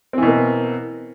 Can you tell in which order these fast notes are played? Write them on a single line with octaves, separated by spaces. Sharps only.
C4 E3 B2 A#3